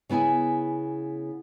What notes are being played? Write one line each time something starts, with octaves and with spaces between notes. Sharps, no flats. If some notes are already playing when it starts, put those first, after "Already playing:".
C#3 B3 E4 G#5